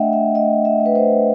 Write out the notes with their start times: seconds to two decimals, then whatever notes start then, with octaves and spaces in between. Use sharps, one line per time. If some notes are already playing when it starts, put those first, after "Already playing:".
Already playing: A3 D4 D#5 E5 F#5 G5
0.13 E5
0.35 A3 D#5
0.65 E5
0.80 A3
0.86 B4
0.95 C5